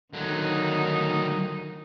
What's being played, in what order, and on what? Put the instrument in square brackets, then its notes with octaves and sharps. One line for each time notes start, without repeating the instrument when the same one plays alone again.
[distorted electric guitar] D3 F#3 [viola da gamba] D#3 D#4